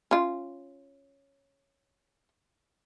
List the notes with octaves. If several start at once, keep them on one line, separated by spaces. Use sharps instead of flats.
C#4 F4